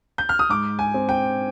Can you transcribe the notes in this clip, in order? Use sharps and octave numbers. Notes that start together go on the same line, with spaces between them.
G6
F6
D#6
G#2 D6
G#5
C4
G5